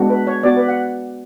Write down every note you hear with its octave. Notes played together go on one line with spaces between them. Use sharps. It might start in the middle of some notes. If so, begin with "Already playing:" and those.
Already playing: G#3 B3 D4 F#4
B4
C#5
B3 F#4 D5
B4
F#5